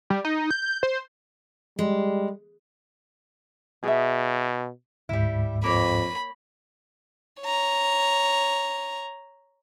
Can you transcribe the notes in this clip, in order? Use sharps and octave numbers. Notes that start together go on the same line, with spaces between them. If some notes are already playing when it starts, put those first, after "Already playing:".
G3
D#4
G6
C5
G3 G#3
B2 G#4 E5
D2 G#2 G3 E4
F2 A#3 C#5 B5
C#5 A#5